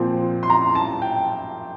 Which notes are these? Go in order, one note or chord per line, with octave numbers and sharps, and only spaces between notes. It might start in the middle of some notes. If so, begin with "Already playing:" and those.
Already playing: A#2 F3 C4
C6
A#5
A5
G5